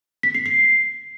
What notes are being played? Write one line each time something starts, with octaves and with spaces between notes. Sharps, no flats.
B6
C7
C7